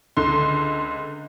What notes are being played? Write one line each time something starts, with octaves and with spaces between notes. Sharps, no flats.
C#2 D3 C6